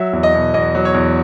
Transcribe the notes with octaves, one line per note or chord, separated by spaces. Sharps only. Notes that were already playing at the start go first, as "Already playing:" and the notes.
Already playing: F#3 E5
E2
D#5
B2
E2 D#5
F#3
C#5
E2